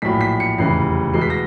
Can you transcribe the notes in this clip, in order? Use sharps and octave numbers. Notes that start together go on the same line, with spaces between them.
A#1 A2 F#3 B6
B6
C#7
F1 E2 C#3 E3 G3 C7
E2 B2 G#3 C7
B6
A#6